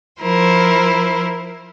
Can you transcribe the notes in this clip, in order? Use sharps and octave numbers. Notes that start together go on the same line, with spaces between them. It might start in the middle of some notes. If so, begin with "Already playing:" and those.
F3 E4 A#4 C5